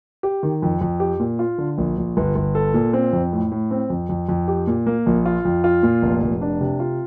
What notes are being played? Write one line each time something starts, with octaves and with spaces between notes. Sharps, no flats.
G4
D#3
F2
F2
G4
A#2
F4
D3
A#1
A#1
G1
G1
A4
A#2
C4
F2
A2
A2
C4
F2
F2
F2
G4
A#2
A#3
A#1
F4
F2
F4
A#2
F1
F1
D4
C3
F4